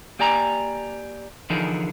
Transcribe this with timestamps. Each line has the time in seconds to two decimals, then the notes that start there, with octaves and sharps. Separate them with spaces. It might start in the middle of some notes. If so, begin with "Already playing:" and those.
0.19 A#3 G4 D5 G#5 A#5
1.50 D3 E3 F3 D#4 G#4 A#4